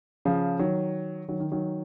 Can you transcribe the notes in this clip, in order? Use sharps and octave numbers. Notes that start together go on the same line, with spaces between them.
C#3 F3
D#3 F#3
D#3 F#3
D#3
D#3 F#3